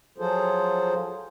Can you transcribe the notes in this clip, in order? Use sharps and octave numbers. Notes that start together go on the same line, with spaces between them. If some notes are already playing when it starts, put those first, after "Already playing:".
F3 F#3 F4 G#4 A4 C5